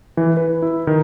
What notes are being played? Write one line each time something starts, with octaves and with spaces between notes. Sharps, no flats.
E3
B4
E4
D#3